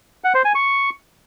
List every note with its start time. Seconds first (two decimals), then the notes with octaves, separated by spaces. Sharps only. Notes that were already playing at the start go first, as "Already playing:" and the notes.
0.24 F#5
0.34 C5
0.45 G#5
0.55 C#6